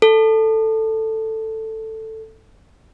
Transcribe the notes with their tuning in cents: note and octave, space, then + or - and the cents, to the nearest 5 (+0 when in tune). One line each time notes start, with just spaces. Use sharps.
A4 +10